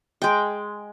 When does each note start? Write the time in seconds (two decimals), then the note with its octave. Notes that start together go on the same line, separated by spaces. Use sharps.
0.22 G#3 G5